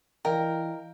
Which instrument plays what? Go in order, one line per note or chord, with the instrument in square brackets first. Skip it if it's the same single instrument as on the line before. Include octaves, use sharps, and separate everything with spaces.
[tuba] E3 [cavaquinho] A#4 [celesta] D5 D#5 F5 [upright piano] G5